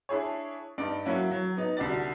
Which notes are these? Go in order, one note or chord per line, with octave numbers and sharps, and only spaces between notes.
D4 E4 G#4 C#5
G2 D#4 D5 D7
F#3 A#3 C#4 E4 F#4
F#3
B3 D#4
C2 D3 F#4 D5 A6